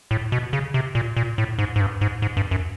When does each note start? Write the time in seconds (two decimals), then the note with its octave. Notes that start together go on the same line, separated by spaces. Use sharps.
0.11 A2
0.32 B2
0.53 C#3
0.74 C3
0.95 A#2
1.17 A#2
1.38 A2
1.59 G#2
1.76 G#2
1.80 G2
2.01 G#2
2.22 G#2
2.37 G2
2.51 F#2